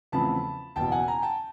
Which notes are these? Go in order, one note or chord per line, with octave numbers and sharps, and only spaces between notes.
E2 C#3 F3 A3 C4 A5 B5
F#1 E2 B2 G5 A5
F#5 G#5
G#5 A#5
G5 A5